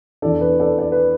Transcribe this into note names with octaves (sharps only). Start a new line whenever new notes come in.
E2 E3 D4 A4 D5
B4
A4 D5
D5
B4